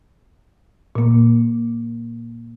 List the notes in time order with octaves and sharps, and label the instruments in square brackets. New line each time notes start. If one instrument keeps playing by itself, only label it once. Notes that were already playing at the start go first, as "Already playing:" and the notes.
[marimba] A#2 A#3